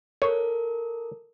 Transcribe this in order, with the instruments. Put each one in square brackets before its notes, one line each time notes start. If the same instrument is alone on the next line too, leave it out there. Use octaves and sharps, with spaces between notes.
[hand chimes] A4 A#4 [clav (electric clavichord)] C#5